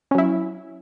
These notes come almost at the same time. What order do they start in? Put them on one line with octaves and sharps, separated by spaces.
C#4 F#3 E4